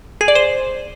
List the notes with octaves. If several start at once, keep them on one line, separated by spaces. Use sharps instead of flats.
G#4
D5
C5